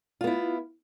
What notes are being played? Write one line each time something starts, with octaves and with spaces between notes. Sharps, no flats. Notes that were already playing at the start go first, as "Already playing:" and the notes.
B3 E4 F4